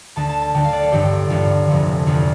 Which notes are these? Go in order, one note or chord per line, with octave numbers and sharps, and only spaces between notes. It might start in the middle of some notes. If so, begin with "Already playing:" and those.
D2 D3 A5
A5
A5
D2 D3 G5
F5
D5
A4
A1 G2 D3 G4
A1 G2 D3 F4
F1 F2 D3
F1 F2 D3 F4